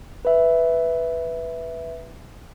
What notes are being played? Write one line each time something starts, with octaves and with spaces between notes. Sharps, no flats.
B4 E5